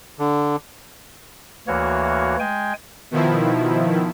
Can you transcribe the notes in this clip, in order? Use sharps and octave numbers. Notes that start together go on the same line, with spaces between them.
D3
D2 E3 A#3 F#4 C#5
G#3 G5 G#5
B2 D#3 F3 E4